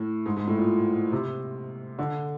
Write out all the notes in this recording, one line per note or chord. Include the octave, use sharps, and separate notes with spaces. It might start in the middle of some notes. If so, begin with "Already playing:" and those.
Already playing: A2
G#2
G#2
A2
A#2
C3
D3